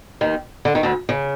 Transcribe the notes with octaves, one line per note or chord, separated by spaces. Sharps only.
D#2 D#3
D3
D#3
D2 D3
C#3